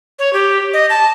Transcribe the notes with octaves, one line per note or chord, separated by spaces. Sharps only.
C#5
G4
D#5
A5